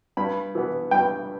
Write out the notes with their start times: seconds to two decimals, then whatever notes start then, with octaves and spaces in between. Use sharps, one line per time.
0.17 G2 B5
0.55 E3 B3
0.91 G2 G5